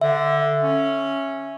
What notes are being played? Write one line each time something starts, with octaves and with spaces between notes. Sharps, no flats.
D3 E5
C#4